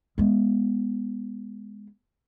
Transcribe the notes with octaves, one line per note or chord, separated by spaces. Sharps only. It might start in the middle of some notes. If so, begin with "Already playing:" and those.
G#3 B3